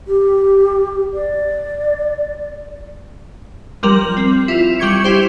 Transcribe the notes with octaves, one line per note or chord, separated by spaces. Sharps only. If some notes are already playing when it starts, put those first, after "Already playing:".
G4
D5
F3 G3 A#4 F#7
C4
E4 F4
G3 G4 C#6 G#6 C#7
E4 F4 G4 C5